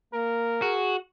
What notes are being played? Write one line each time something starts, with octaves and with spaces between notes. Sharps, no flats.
A#3 A#4
F#4 G#4